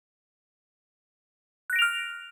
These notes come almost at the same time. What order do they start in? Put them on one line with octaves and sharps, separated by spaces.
F#6 A#6 D7 F7 F6